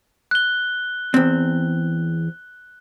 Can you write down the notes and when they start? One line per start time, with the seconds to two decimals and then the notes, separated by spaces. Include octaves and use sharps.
0.31 F#6 G7
1.14 E2 C4